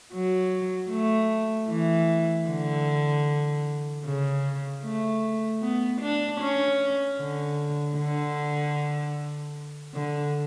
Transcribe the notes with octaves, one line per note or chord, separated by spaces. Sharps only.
F#3
A3
E3
D3
C#3
A3
B3
D4
C#4
D3
D3
D3